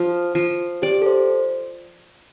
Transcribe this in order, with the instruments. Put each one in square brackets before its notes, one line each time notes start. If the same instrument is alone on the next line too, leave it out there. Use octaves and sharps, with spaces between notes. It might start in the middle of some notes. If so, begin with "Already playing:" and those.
Already playing: [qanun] F3
F3
[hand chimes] G4 [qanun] D5
[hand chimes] A4
C5